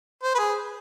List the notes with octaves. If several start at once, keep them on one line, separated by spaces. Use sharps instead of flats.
C5
B4
G#4